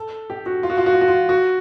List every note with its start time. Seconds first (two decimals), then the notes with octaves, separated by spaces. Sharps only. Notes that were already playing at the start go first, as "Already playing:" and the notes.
Already playing: A4
0.30 G4
0.46 F#4
0.63 F4
0.70 F#4
0.78 F4
0.86 F#4
0.93 F4
1.01 F#4
1.08 F4
1.29 F#4